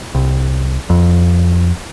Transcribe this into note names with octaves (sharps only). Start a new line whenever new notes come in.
C2
F2